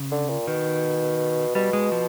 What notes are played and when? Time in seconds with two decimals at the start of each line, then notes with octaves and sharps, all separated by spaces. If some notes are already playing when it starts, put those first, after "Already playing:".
Already playing: C#3
0.11 D3
0.29 A#2
0.47 B2 D#3
1.55 B2 G3
1.73 G#3
1.92 F3